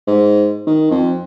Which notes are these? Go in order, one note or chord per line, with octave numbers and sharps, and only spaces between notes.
G#2
D#3
F2